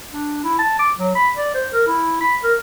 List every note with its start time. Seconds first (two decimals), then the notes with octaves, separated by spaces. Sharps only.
0.11 D4
0.44 E4
0.59 A5
0.79 D6
0.98 F#3
1.15 B5
1.36 D5
1.54 C5
1.73 A#4
1.87 E4
2.21 B5
2.44 A#4